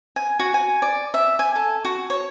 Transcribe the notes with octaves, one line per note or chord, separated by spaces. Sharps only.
G#5
F#4
G#5
D5
E5
G#5
A4
F#4
C#5